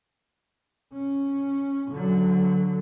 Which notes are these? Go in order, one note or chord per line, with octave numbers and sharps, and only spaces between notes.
C#4
D3 F#3